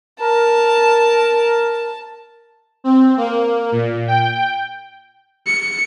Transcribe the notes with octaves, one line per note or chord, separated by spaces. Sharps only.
A#4 A5
C4
A#3
A#2
G5
C#7